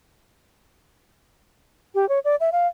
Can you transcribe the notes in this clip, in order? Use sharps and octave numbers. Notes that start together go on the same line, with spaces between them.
G4
C#5
D5
E5
F5